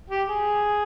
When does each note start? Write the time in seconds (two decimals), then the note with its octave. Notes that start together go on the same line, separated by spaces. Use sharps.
0.10 G4
0.29 G#4